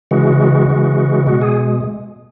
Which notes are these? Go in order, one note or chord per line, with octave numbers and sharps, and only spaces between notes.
C#3 E3 G#3 F#4
C#3 E3 G#3
B2 G#3 F#4
G#4